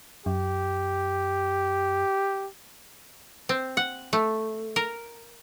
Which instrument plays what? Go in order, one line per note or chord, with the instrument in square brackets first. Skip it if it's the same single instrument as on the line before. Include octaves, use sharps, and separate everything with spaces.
[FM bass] F#2 [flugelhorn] G4
[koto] C4
F#5
A3
A#4